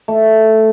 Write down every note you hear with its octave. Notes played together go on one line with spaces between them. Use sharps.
A3